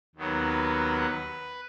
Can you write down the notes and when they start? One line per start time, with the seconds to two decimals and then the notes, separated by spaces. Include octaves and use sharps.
0.16 D#2 D#3 F#3 B3
0.48 B4